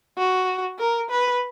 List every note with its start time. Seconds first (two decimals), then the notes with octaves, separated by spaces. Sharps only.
0.18 F#4
0.79 A#4
1.10 B4